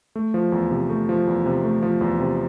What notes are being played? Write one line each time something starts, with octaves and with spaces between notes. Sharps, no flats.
A3
F3
E2
C3
A3
F3
E2
C3
A3
F3
E2
C3